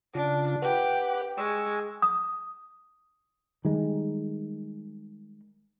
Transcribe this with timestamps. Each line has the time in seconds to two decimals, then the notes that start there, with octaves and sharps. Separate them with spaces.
0.15 C#3 D4 F4
0.62 G4 B4 F#5
1.38 G#3 G#5 C#6 E6
2.02 D#6
3.65 D#3 G3 G#3